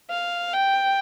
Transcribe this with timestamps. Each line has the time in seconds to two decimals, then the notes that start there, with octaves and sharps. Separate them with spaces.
0.10 F5
0.53 G5